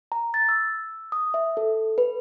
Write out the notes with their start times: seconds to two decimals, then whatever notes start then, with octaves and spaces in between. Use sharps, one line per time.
0.12 A#5
0.34 A6
0.49 E6
1.12 D#6
1.34 E5
1.57 A4
1.98 B4